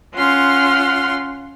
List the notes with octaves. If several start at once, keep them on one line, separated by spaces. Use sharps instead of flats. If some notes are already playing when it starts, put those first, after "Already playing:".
C#4 F4 F#5 C6 F6